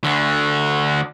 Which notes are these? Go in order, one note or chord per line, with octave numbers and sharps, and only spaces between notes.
D2 D3